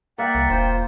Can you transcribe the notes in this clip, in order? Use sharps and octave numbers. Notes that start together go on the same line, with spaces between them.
A#3 D5 E5 F#5 G5
C2
E1 F4 C5